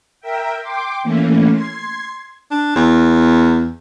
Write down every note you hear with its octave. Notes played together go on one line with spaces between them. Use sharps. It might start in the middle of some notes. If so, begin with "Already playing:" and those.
A#4 E5 G5
G5 C6 D6
E3 A3 A#3 C#4
C6 G#6
D4
E2